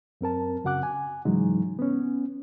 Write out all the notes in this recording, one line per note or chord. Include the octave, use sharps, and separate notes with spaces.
F#2 C4 A#4 A5
F#2 C#3 F#4 F#5 D6 F#6
G#5
G#2 C#3 E3 F#3 G#3 D#4
B3 C#4